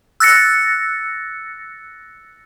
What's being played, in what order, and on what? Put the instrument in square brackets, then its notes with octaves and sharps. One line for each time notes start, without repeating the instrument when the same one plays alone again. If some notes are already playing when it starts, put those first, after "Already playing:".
[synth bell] E6 F#6 A6 A#6 C#7